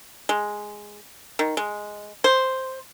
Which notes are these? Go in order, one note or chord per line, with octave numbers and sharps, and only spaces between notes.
G#3
D#3
G#3
C5